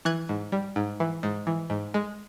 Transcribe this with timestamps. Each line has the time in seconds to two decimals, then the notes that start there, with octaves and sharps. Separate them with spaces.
0.05 E3 F#6 G#6
0.29 G#2
0.52 G3
0.76 G#2
1.00 E3
1.23 G#2
1.47 E3
1.70 G#2
1.94 G#3